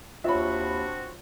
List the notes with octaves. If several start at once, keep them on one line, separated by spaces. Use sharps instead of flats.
D#2 C4 D4 F4 F#4 C#5 E5 B5